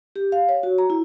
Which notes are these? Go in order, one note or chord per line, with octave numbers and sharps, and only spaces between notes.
G4
F5
C#5
F#4
A#5
E4